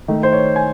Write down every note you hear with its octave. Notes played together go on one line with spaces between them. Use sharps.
D#3 A3
C5
C#5
G#5